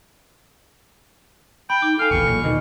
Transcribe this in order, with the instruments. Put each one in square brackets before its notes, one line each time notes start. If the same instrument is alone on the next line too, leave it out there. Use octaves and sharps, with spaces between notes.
[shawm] G5 [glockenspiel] B5
[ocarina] D#4 [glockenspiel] D6
[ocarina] A4 [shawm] F5 [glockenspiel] G#5 F6
[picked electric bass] D#1 A1 E2 [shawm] C#6
[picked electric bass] B1 A#2
[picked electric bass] D#2 B2 D#3 [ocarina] D#5